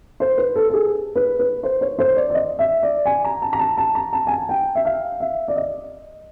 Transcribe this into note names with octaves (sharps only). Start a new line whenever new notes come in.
C5
B4
A4
A4
G#4
B4
B4
C5
C#5
C5
D5
D5
D#5
E5
D5
G#5
A#5
A5
A#5
A5
A5
A#5
A5
G#5
A5
G5
E5
F5
E5
D5
D#5